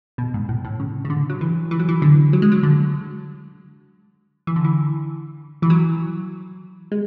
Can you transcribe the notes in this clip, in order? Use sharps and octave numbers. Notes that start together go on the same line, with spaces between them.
B2
G#2
A2
A2
C#3
C#3
D3
F#3
E3
E3
F#3
E3
D3
F#3
G#3
F#3
D3
E3
D3
E3
E3
F#3
G#3